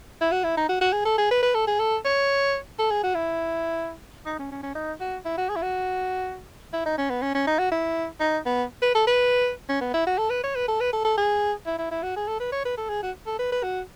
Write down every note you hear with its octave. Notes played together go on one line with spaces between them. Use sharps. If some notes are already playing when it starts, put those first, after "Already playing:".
E4
F#4
E4
D#4
F#4
F#4
G#4
A4
G#4
B4
B4
A4
G#4
A4
C#5
A4
G#4
F#4
E4
D#4
C#4
C#4
C#4
D#4
F#4
E4
F#4
G#4
E4
F#4
E4
D#4
C#4
B3
C#4
C#4
D#4
F#4
E4
D#4
B3
B4
A4
B4
C#4
B3
E4
F#4
A4
B4
C#5
B4
A4
B4
A4
A4
G#4
E4
E4
E4
F#4
G#4
A4
B4
C#5
B4
A4
G#4
F#4
A4
B4
B4
F#4